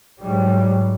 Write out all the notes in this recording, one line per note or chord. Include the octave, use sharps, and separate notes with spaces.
G#2 F#3 G3